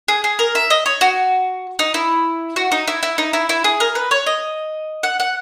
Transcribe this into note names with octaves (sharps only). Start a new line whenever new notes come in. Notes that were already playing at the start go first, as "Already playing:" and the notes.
G#4
G#4
A#4
E5
D#5
C#5
F#4
D#4
E4
F#4
D#4
E4
E4
D#4
E4
E4
G#4
A#4
B4
C#5
D#5
F#5
F#5